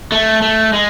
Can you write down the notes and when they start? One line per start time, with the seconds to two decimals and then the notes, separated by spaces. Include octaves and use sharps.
0.12 A3
0.42 A3
0.73 G#3